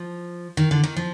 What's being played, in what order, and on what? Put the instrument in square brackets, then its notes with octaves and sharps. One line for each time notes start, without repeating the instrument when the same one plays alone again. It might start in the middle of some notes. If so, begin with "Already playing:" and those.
Already playing: [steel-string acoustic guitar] F3
D#3
D3
D#3
F3